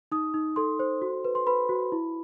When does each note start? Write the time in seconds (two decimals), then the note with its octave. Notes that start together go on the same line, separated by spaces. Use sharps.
0.12 D#4 D#6
0.34 D#4
0.56 A4 C6
0.79 C5
1.02 F#4
1.25 B4
1.35 C6
1.47 B4 B5
1.69 F#4
1.92 E4